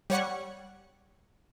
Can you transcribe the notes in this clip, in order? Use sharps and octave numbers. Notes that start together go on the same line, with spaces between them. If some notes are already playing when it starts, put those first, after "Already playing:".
G3 C#5 F#5 C#6